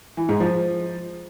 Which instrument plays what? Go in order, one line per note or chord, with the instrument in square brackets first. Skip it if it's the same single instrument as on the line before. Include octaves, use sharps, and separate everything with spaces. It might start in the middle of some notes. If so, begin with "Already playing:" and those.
[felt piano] E3
G#2
F3